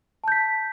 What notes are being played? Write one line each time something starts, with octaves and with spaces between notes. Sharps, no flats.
A5 G6 B6